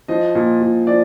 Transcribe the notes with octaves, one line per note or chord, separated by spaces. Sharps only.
F3 D#5
A#2
A#2
F3 D5